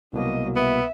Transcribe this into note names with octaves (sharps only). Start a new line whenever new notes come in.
C2 B2 F#3 A#3 D#5
B3 E5